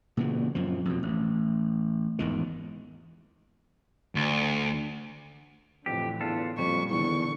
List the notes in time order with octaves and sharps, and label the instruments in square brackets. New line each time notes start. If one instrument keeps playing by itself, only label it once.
[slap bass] A#2 C#3 E3
F#2 F3
F2 B2
A1
G#1 E2 D#3
[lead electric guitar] D2
[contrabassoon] F2 [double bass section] A2 D3 E3 [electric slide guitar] G4
[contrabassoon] E2 [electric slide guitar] D4 F4 A4
[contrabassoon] F2 [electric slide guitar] A#2 G3 [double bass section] F#3 [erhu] C#6
[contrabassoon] E2 [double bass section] D3 D#3 [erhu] C#6